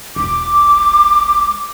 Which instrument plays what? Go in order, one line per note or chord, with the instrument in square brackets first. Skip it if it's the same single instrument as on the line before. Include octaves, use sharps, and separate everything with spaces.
[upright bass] E1 B1 [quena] D6